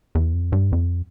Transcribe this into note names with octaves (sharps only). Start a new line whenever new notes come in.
E2
F2
G2
F2